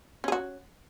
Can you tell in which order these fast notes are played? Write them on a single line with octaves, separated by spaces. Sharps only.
C#4 G#4 F#4